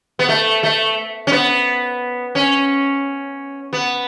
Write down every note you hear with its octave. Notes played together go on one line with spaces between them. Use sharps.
B3
A3
A3
C#4
B3
C#4
B3